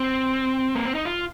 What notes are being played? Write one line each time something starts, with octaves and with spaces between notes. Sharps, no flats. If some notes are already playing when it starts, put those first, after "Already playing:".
Already playing: C4
A#3
C4
D#4
F4